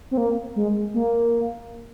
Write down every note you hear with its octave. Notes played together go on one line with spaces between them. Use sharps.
C4
A#3
G#3
A#3